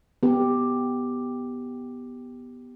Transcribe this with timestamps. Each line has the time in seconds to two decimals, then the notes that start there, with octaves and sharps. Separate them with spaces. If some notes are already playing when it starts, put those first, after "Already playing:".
0.23 B3 G4